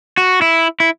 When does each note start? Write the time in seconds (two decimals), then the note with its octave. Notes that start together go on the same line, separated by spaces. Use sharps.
0.18 F#4
0.42 E4
0.80 E4